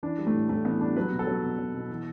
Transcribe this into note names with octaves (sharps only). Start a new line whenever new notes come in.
E3 D4
G3
A3
A2
A2 A3
E3 B3
G3 D4
F#3 B4
B2
A4
F#3
B2
F#3
B2
E3